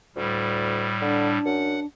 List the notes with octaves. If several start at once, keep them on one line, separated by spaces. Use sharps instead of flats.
D2 A2 G3
D3 D4
F#2 F#5